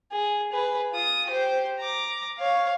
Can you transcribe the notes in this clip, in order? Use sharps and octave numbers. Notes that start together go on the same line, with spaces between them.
G#4
G#4 B4
F4 D#6
G4 C5
A#5 D6
C#5 F5